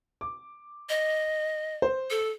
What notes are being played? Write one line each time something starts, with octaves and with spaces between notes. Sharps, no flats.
D6
D#5
C5
A4